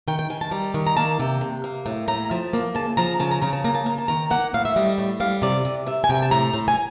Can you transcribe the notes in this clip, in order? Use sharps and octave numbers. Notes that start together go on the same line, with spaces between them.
D#3 G5
G5
D#3 G#5
A5
G3 A#5
D#3
A#5
A#3 A5
C3 G5
C3
A#3
A2
A2 A#5
F3 A5
A#3
C#3 A5
F3 A#5
C#3 A5
A#5
C#3 A#5
A5
A#3 A#5
A5
A#3 A#5
A5
D#3 A#5
A#3 F#5
A2 F5
E5
G3 D#5
D#5
A2
G3 F5
C3 D5
C3
C3 E5
G#5
C3 G5
A5
A2 A#5
A2
G#5